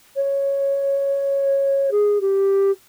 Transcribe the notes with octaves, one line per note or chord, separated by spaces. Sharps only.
C#5
G#4
G4